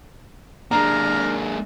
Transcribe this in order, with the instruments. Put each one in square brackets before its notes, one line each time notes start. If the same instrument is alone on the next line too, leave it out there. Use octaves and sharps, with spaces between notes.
[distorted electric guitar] G#3 A#3 [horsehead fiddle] D4 [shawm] A#4 [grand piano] A#5